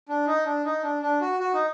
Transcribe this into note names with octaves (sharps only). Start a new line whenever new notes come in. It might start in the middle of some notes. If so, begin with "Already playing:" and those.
D4
D#4
D4
D#4
D4
D4
F#4
F#4
D#4